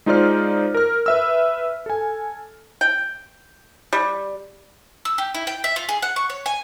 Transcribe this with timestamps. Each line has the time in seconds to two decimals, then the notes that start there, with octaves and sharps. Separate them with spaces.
0.06 G#3 D#4 F4 C5 D5 F6
0.75 A#4 F6
1.06 B4 E5 E6
1.86 A4 G#5
2.81 G5
3.93 G3
5.05 E6
5.18 G4
5.35 E4
5.47 G5
5.64 E5
5.76 F4
5.89 G#4
6.02 F#5
6.16 C#6
6.30 C#5
6.46 G#5